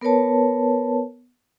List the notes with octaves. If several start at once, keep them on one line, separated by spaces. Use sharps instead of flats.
B3 A#4 B4 C#5 A5